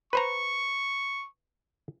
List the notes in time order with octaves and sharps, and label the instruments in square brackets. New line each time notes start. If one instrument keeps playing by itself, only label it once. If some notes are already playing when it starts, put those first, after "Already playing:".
[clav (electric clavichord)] B4 C5 A#5 [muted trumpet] C#6